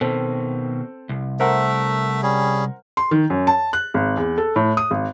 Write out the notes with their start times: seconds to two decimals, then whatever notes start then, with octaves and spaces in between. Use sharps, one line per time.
0.01 B2 D#3 C4 A4
1.09 C2
1.40 A3 A#4 C5 E5 F#5
2.23 G3 C#4 G#4
2.97 C6
3.11 D#3
3.30 F#2
3.47 A5
3.73 F#6
3.94 G#1
4.17 E2
4.38 A4
4.56 A2
4.77 D#6
4.91 G#1